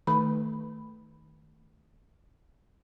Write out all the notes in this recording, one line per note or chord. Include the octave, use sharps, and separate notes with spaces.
D#3 A3 B4 B5